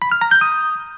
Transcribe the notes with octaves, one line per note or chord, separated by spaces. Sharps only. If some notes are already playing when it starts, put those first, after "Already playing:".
B5
F6
A#5
G6
D#6